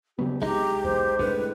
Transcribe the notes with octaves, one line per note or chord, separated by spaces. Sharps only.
C#3 F#3 B3 G4
C2 G#3 D#4 G4 A#5
B1 E2 C5
C2 A2 D3 G#3 B4